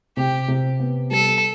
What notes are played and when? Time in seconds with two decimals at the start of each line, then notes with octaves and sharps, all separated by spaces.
0.17 C3 G4
0.48 C3
0.80 B3
1.11 G3 A4